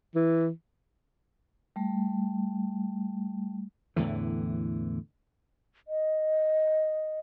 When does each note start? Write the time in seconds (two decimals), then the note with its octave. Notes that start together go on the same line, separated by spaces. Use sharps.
0.15 E3
1.76 G3 A3
3.96 E2 A2 D3 E3
5.88 D#5